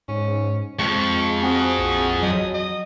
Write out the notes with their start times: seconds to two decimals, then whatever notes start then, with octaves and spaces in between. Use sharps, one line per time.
0.08 G#2 C#4
0.79 F2 F3 G#3 C#6
1.43 C4 F#4 G#4
1.79 A#1
2.22 F#3 D#5
2.54 D#5